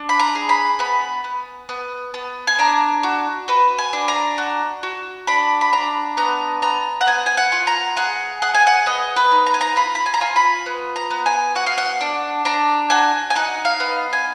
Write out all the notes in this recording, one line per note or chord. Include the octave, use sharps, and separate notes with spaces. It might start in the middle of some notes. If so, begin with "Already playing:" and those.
Already playing: D4
B5
A#5
G#4
B5
B3 B5
B3
B3
B3
G#5
D4 A#5
F#4
F#4 B4
G#5
D4
A#5
F#4
F#4
D4 B5
B5
D4 A#5
B3 A#5
B3 A#5
F#5
B3 G#5
G#5
F#5
F4
A#5
G#4 F#5
G#4 F#5
G#5
F#5
B3 D#5
B4
D#4
A#5
G#5
A#5
F4 B5
B5
G#5
A#5
F4 G#5
B5
B3
A#5
B3
G#5
F#4 F#5
F5
F#5
D4
D4 A#5
F#4 G#5
G#5
D#4 F#5
F5
B3
G#5